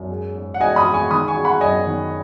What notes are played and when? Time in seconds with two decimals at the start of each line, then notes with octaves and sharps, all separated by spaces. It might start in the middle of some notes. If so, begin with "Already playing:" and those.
Already playing: F#2
0.10 G#3
0.35 G#2
0.54 F#5
0.60 G#2 D#5 G#5
0.76 B5 D#6
0.85 G#3
0.93 G#5 C#6
1.11 D#3 B5 D#6
1.28 G#5 C#6
1.36 G#3
1.44 F#5 B5
1.61 F#2 D#5 G#5
1.87 D#3